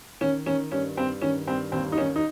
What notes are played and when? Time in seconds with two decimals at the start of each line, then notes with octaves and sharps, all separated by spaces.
0.21 D#3 C#4
0.46 D#3 C#4
0.72 G2 C#4
0.97 G2 C4
1.21 D#3 C#4
1.47 G2 C4
1.72 D#2 C4
1.92 D#4
1.98 D#3 C#4
2.16 D#4